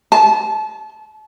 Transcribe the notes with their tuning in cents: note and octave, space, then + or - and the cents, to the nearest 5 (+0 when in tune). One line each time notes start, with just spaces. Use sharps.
A5 -30